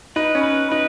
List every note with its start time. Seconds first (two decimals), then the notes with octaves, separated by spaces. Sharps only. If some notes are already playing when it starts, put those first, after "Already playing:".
0.16 D#4 B4
0.35 C#4
0.44 B4
0.71 D#4 B4